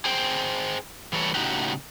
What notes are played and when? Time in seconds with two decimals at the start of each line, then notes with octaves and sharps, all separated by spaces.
0.05 G#4 C5 G5
1.13 E3 G3 A4 C#5
1.34 A2 C#3 D#4 F#4 G4